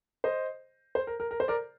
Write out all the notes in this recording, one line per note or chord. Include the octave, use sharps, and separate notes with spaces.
C5 D#5
C5
A#4
A#4
A#4
C5
A#4 D5